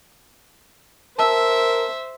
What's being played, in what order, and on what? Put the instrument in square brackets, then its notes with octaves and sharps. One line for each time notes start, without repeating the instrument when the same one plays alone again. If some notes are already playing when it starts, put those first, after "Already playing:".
[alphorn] A#4 [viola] C5 E5 [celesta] A5 E6